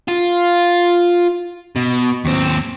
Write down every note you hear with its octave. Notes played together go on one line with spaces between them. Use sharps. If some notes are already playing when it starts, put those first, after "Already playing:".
F4
B2
D#2 C4